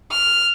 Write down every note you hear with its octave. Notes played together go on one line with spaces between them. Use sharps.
F6